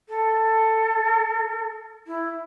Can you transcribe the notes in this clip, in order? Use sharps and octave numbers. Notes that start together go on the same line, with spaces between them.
A4
E4